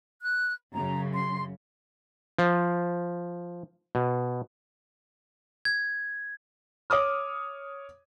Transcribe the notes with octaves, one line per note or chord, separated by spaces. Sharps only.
F#6
F#2 C#3 A#5
C6
F3
B2
G#6
C#5 D6 D#6 F6